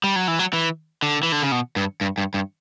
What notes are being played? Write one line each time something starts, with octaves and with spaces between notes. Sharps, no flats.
G3
F#3
E3
F#3
E3
D3
E3
D3
C#3
B2
G2
G2
G2
G2